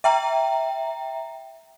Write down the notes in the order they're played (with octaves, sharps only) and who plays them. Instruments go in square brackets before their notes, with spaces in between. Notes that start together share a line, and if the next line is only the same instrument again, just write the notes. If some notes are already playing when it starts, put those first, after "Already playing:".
[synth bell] E5 G5 A#5